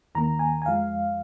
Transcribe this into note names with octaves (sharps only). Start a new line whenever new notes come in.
D#2 D#3 A#3 A#5
G#5
G#5
F2 F3 G#3 F5